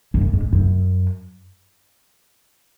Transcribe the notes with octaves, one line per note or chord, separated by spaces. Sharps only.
F#2
G#2
F#2